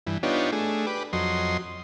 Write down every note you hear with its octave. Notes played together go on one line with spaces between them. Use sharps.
G2 E3
B3 D4 D#4 F4 G4 C#5
A3 D4 G#4
G4 B4 D5
F2 F#3 D#5 C6